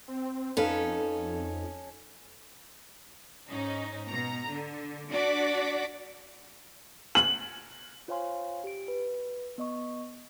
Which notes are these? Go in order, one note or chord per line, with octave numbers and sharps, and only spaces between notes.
C4
F2 C#4 D#4 A4 B4 F5
G#2 C#4 D#4
B2 A#5
D3
D4 F#4 D5 F#5 D6 B6
F#7
F4 C5 C#5 F5 G#5 C6
G4 D7
B4
B3 D#5 C#6